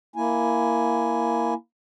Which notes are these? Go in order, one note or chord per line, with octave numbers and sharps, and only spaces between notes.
A#3 E4 G#5